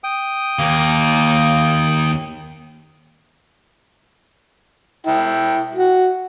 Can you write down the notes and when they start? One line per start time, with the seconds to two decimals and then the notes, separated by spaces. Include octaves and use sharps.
0.04 G5 D#6
0.59 D#2 A#3
5.07 E4 G5
5.75 F#4